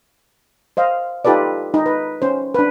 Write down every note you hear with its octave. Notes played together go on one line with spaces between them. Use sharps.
C5 D#5 F5
D#4 F4 G4 A4 B4 D5
D#4
B4
C#4 C5
D4 B4